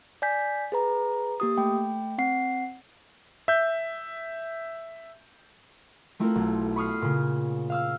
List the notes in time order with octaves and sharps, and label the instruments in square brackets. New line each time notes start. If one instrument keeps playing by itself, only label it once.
[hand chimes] D5 G#5 G6 B6
G#4 B4 A#5
A#3 G4 D#6
A3 G5
C4 F#5 C7
[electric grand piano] E5 G6
[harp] A3 C4 E4 F4 A4 A#4
B1
B5 C#6 D#6 F6 C7
A#2 C#3
F5 E6 F6